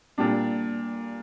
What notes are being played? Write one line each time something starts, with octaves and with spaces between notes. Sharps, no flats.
A#2 G3 D4